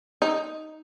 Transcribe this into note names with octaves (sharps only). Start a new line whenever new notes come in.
D#4